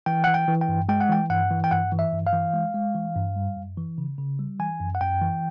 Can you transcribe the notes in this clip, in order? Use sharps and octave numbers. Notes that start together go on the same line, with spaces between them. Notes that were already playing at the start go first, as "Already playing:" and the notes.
E3 G5
E3 F#5
G5
E3
G5
G2
G#3 G5
F#5
E3 G5
G2 F#5
E3
G5
G2 F#5
E3
E5
G2
F5
E3
G#3
G#3
E3
G2
G3
F#2
E3
C#3
C#3
G3
E3 G#5
F#2
F#5
F#2 G5
E3